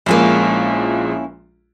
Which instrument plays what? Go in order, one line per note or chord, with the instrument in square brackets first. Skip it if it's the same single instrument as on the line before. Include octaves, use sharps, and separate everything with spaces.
[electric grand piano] A#1 F3 G#3 [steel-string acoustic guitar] A#3 C#4 E4